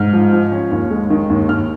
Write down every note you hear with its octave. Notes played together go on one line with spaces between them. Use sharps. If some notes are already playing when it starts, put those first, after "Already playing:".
Already playing: G#2 F6
F3
F3
C#4
D#2
G#3
D#3
D#2
D#2 F6